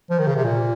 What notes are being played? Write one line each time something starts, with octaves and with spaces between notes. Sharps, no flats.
F3
D#3
C#3
C3
A#2